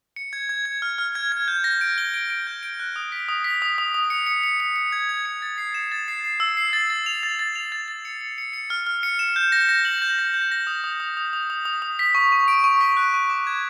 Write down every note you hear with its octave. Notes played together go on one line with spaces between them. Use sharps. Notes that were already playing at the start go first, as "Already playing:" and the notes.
C#7
G#6
G#6
G#6
F6
F6
G#6
G#6
G6
A#6
D7
G7
D7
D7
G6
D7
F#6
D#6
B6
D#6
B6
D#6
D#6
D#6
C#7
C#7
C#7
C#7
C#7
G#6
G#6
C#7
A6
C7
E7
A6
C7
C7
E6
C7
A6
A6
F7
A6
A6
F7
A6
A6
C#7
C#7
C#7
C#7
F6
F6
C#7
E7
G6
A#6
A#6
F#7
G6
A#6
G6
A#6
D#6
D#6
D#6
D#6
D#6
D#6
D#6
D#6
B6
C#6
C#6
D7
C#6
B6
F#6
C#6
D6
G#6